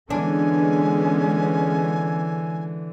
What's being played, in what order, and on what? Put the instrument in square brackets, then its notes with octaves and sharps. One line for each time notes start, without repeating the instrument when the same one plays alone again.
[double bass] D3 E3 [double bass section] G#3 B3 C#4 [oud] D4 [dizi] G#5